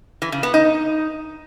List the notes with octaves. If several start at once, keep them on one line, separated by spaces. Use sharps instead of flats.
E3
C#3
B3
D#4